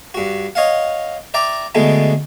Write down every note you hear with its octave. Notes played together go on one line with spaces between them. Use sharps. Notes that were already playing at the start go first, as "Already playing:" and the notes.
G2 F#4
C#5 D#5 F5 F#5
D5 E5 G5 A#5 D6
B2 D3 G#3 A3 B3